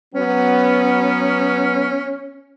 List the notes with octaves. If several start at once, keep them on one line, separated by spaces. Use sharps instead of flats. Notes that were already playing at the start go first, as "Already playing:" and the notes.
F#3 B3 C#4